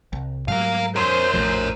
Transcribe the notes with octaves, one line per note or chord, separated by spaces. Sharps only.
C2
G#2 F#3 G3 A#4 F5
A#4 C5 C#5
A#1 A2 F3